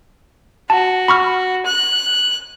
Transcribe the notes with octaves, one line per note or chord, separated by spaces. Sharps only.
F#4 A5
B5 C#6 F6
F#6